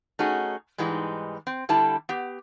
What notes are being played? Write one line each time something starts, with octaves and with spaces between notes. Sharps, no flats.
A3 C#4 D#4 F#4 G#4
G#2 E3 G3 G#3 D#4
C4
D3 G3 E4 A4 A5
B3 G4